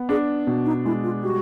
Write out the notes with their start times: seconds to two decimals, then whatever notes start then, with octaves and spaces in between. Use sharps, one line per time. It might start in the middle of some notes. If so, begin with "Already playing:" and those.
Already playing: B3
0.09 D4 G#4
0.47 B2
0.65 D#4
0.85 G#3 E4
1.03 F4
1.22 G3 F#4